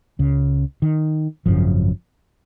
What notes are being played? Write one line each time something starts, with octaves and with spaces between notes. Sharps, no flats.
C#2 C#3
D#3
G#1 F#2 C#3 F3